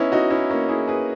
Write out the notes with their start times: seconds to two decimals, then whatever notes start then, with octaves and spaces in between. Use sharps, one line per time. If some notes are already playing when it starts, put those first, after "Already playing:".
Already playing: B3 C#4 D#4 E4
0.12 D#4 F#4
0.30 C#4 E4
0.49 A#3 C#4
0.69 E4 G#4
0.88 G#4 B4